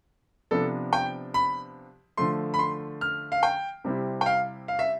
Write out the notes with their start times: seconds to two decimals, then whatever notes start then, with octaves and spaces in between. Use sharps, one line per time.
0.51 C3 F3 B3 D4 A4
0.93 G5
1.34 B5
2.17 D3 F3 A3 C6
2.54 B5
2.59 C6
3.01 F6
3.32 F5
3.43 G5
3.84 C3 G3 C4 E4
4.21 G5
4.26 F5
4.68 F5
4.79 E5